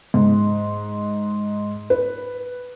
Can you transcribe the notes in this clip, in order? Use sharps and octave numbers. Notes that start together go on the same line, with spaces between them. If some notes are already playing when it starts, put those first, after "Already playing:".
G#2
B4